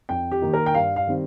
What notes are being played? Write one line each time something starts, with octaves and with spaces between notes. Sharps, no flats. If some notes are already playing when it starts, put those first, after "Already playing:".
F2 G5
G4
D#3 A#3 D#4
A#4
G5
G2 F5
F5
D#3 G3 C4